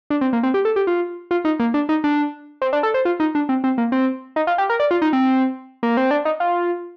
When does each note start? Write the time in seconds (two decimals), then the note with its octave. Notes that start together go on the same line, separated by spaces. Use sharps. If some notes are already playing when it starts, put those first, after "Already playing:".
0.10 D4
0.21 C4
0.33 A#3
0.43 C4
0.54 G4
0.65 A4
0.76 G4
0.87 F4
1.31 F4
1.45 D#4
1.60 A#3
1.74 D4
1.89 D#4
2.04 D4
2.62 C4
2.73 D4
2.83 A4
2.94 C5
3.05 F4
3.20 D#4
3.35 D4
3.49 C4
3.64 C4
3.78 A#3
3.92 C4
4.36 D#4
4.47 F4
4.58 G4
4.70 A#4
4.80 D5
4.91 F4
5.02 D#4
5.13 C4
5.83 A#3
5.97 C4
6.11 D4
6.25 D#4
6.40 F4